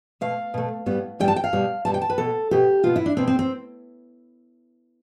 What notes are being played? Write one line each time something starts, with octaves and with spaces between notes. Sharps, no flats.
B2 A3 F5
B2 A3
A2 G3 B3
A2 G3 B3 G5
A5
G5
F5
B2 G3 B3
B2 G3 B3 A5
G5
A5
B4
B2 B3 A4
B2 B3 G4
B2 B3 F4
E4
D4
B2 B3 C4
C4
C4